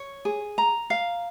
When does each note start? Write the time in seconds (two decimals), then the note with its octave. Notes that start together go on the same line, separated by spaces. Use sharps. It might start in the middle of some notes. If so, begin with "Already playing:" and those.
Already playing: C#5
0.25 G#4
0.58 A#5
0.90 F5